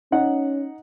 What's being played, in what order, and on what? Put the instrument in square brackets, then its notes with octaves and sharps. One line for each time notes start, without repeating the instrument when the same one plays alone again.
[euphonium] C#4 [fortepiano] D#4 F#5